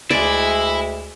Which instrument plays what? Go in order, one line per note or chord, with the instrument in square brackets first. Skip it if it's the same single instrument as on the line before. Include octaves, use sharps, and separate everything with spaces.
[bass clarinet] D2 [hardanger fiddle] G#3 [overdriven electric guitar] E4 [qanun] D5